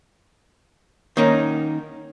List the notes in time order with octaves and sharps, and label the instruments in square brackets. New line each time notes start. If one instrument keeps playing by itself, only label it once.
[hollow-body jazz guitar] D#3 A#3 C#4 D#4